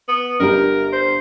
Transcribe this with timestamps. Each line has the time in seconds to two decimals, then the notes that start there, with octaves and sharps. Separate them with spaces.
0.08 B3
0.40 G1 G4 A#4 A#5
0.92 C5